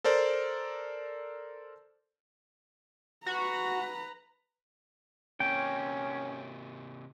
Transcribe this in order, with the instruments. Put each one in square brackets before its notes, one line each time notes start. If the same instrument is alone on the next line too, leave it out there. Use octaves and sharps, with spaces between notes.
[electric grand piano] A4 A#4 C5 D5
[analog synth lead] F#4 [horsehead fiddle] B4 A#5
[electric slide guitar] C3 A#3 [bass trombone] C#4 [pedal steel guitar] G5